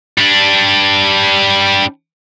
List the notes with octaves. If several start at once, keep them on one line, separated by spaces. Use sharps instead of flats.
G3 D4